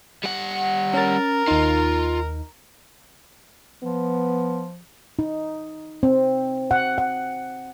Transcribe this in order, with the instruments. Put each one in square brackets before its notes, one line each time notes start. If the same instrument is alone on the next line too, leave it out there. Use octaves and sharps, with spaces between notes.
[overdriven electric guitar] G3 F#5
[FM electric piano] C#4 A6 [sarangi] A#4
[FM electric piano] D#2 D#4 [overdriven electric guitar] F4
[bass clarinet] F3 [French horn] B3
[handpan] D#4
C4
F#5
F#5